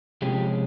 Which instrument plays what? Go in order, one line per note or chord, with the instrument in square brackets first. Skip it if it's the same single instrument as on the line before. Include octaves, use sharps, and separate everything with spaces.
[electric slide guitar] C3 F3 G#3 C#4 G4